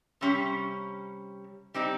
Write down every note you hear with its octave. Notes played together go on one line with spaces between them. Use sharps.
C3 G3 C#4
G3 C4 D#4